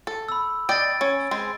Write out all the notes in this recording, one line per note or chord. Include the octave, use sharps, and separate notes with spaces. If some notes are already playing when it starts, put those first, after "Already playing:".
A4
B5 E6
D5 D#5 G5 A6 D7
C#4
G#3 C4 C5